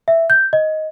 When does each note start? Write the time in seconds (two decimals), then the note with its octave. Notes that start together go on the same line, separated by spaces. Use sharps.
0.08 E5
0.30 G6
0.53 D#5